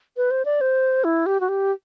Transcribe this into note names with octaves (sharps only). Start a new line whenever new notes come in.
B4
C5
D5
C5
E4
G4
F#4
G4